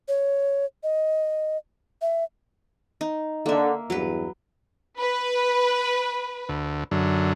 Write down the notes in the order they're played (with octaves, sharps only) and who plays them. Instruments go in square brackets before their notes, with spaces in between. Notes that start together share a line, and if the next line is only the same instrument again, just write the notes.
[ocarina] C#5
D#5
E5
[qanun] D#4
[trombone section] D3 [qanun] A#3 E5
[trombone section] E2 G2 [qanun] F#3 B4
[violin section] B4
[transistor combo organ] D2
F#2 D3